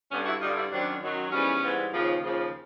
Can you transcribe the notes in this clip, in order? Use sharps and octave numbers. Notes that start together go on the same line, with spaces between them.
G2 D3 G3 B3 C#4
E4 F#4
G2 D3 G3 D#4 F4
D4 E4
F#2 D#3 F#3 C4 D4
F#2 D#3 F#3
G#2 E3 G3 B3 C#4
G#2 E3 G3
D#2 C#3 F3
D#2 C#3 F3